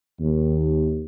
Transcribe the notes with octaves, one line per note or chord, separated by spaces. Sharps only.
D#2